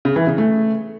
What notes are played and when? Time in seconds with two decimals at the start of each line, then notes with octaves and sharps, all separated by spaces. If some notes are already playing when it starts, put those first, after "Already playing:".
0.05 C#3
0.16 E3
0.27 C#3
0.38 A3